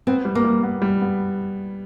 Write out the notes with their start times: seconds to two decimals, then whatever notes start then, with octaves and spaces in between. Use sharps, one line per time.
0.07 B3 C4
0.25 G3
0.35 A#3
0.44 G3
0.63 B3
0.82 G3
1.01 B3